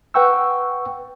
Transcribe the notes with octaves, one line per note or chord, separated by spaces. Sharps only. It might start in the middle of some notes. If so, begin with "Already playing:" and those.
B4 F#5 G5 C#6 E6